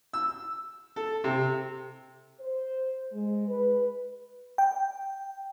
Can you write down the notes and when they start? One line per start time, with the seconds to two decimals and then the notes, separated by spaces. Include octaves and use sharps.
0.13 E6
0.96 A4
1.24 C3
2.39 C5
3.12 G#3
3.48 B4
4.58 G5